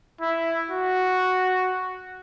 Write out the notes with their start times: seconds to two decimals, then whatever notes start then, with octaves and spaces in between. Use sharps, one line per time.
0.21 E4
0.71 F#4